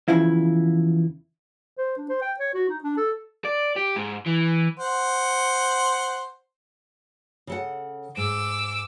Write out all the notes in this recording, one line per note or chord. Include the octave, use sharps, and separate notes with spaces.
E2 C#3 F3 E4
C5
D4
C5
G5
C#5
F#4
D#4
D4
A4
D5
G4
G#2
E3
C5 F#5
C#3 A4 F#5
G#2 D6 E6